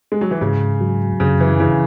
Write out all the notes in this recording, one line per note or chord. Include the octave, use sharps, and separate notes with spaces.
G#3
F#3
E3
G#2 C#3
F#3
F#2 C#3
E3
C#3 E3